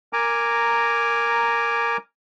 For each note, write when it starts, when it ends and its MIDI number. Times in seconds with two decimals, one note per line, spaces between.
0.13 1.97 70
0.13 1.97 80
0.13 1.97 82
0.13 1.97 86